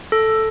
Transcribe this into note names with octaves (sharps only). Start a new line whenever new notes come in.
A4